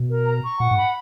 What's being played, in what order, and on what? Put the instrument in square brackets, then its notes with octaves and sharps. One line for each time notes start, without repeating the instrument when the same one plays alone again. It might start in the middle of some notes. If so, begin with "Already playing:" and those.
Already playing: [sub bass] B2
[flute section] A#4
A#5
C#6
[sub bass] A#2 [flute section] F#5
[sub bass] G#2
[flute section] B5